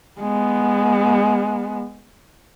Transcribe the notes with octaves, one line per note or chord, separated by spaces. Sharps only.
G#3 B3